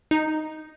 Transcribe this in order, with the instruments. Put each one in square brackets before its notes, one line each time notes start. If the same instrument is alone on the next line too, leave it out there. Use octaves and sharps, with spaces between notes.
[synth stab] D#4